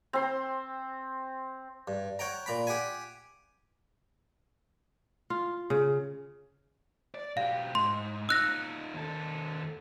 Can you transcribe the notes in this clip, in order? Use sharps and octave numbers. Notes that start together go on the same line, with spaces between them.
C4 C6
G2
C#5 F#5 G5 A#5
A#2 A#5 B5
G4 F#5 G#5
F4
C#3
D5
B1 G4 F5
G#2 C6
D#4 F4 E6 F#6 A#6
D#2 A4